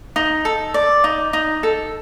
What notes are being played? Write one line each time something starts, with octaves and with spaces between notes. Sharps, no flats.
D#4
A4
D5
D#4
D#4
A4